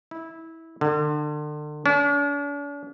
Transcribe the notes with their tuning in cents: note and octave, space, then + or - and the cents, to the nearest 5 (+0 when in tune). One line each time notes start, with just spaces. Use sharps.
E4 -15
D3 +35
D4 -45